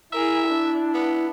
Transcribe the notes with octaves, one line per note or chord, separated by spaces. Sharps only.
E4 G#4 A#4 E5
D4
B3